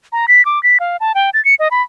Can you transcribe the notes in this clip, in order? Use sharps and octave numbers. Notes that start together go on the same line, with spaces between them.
A#5
B6
D6
B6
F5
A5
G5
A6
C#7
D#5
B5